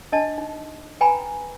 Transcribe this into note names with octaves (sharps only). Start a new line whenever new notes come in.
D4 D#5 A5
D#4
B4 G5 G#5 A#5 B5